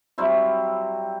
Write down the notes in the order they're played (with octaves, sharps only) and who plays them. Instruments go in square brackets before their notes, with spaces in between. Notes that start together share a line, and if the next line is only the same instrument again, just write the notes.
[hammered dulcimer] F#3 G3 C4 E4